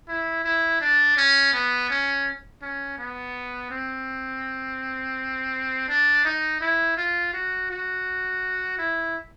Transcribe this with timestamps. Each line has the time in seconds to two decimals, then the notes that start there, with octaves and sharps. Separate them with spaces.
0.08 E4
0.44 E4
0.81 D4
1.17 C#4
1.54 B3
1.90 C#4
2.62 C#4
2.98 B3
3.71 C4
5.89 D4
6.25 D#4
6.61 E4
6.97 F4
7.33 F#4
7.70 F#4
8.78 E4